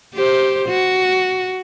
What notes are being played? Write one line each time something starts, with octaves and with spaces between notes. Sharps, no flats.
G4 C5
F#4